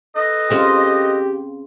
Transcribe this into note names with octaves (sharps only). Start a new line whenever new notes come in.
A4 B4 D#5
C#3 C4 F4 G4